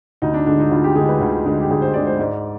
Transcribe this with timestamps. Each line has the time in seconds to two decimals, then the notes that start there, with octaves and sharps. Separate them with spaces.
0.22 D2 D#4
0.34 D4
0.46 D3 G#3 D4
0.60 D#4
0.71 D2 F4
0.84 G4
0.95 D3 G#3 G#4
1.09 B4
1.20 D2
1.45 D3 G#3
1.60 G4
1.70 D2 G#4
1.82 C5
1.94 D3 G#3 D5
2.07 C5
2.19 G#2 D5